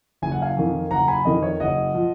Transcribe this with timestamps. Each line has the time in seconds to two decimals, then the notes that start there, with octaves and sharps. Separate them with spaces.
0.22 F#1 G#5
0.32 F#5
0.42 F5 G#5
0.57 F2 D#3
0.90 F#1 F#5 A#5
1.08 G#5 B5
1.25 F2 D#3 D#5
1.43 C#5
1.60 F#1 D#5 F#5
1.94 F3